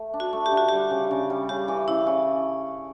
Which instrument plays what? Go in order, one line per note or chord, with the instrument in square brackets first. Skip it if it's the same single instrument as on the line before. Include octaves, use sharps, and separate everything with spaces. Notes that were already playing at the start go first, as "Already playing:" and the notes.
Already playing: [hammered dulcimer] A3
D4
[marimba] F#4
[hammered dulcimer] A3
[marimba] G4
[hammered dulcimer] D3
[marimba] F#4
[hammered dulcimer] G3 [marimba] G4
[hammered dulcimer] C#3
C#3
G3
[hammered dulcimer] C#3 [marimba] G4
[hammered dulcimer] E3
[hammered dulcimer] C#3 [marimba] E4
[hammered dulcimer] C#3